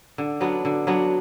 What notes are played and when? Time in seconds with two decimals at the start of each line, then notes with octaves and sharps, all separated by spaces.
0.18 D3
0.41 F#3 B3 D4
0.65 D3
0.87 F#3 B3 D4